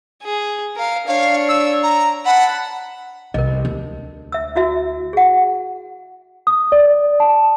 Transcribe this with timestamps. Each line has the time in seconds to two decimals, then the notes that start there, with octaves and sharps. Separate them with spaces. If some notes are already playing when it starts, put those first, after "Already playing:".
0.22 G#4
0.76 A#4 F5
1.07 D4 C#5 F5
1.49 E6
1.83 A#5
2.26 F#5 A5 B5
3.34 C2 A#4 D#5
3.65 D2
4.32 E5 E6
4.56 E4 F#4 E5
5.13 G#4 F#5
6.47 D#6
6.72 D5
7.20 A5